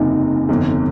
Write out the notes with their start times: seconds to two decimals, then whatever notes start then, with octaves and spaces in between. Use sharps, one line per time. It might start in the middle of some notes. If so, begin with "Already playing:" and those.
Already playing: F#1 E2 C3 D#4
0.49 G1 F2 C3